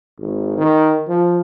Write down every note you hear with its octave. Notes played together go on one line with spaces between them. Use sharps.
G#1
D#3
F3